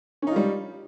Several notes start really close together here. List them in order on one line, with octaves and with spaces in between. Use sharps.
C#4 D#4 F4 G3